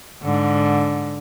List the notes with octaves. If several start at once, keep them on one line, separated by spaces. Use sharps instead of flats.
G#2 D3